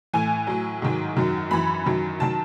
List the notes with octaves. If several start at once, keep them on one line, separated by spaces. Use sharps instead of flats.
A2 E3 G#5
A2 F#3
G#2 D#3 F#3
F#2 D#3 F#3
F#2 E3 B5
F#2 D#3 F#3
D#3 F#3 A5